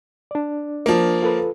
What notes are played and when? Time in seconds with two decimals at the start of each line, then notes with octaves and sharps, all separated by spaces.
0.31 D4 D5
0.86 F3 A#3
1.22 F4 A4 B4